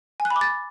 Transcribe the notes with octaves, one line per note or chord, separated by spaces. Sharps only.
G#5
F#6
B5
D6
A6